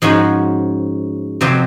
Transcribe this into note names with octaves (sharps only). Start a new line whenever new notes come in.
G#2 F3 G#3 C#4 F#4
F2 C3 F#3 C4